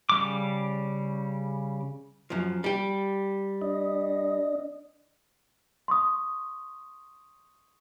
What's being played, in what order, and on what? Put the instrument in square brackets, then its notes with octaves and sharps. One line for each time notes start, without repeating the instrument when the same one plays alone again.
[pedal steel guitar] C#3 G3 D6
[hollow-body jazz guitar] F#2 F3
G3 G4
[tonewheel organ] D4 D#5
[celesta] C6 C#6 D#6